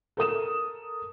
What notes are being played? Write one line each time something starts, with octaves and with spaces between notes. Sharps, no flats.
A4 A#4 D#6 E7